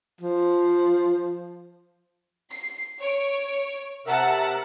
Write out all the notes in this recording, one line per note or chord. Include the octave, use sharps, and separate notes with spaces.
F3
C7
C#5 D7
C3 A#4 E5 F#5 A5